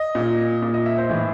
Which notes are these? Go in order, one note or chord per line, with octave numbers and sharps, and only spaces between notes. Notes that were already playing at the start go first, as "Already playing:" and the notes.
Already playing: D#5
A#2
A#2
D#5
E5
C5
A2 E3